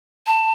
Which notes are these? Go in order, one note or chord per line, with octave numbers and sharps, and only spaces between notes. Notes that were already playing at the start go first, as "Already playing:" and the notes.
A5